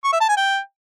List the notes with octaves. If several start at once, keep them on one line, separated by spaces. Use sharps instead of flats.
C#6
E5
A5
G#5
G5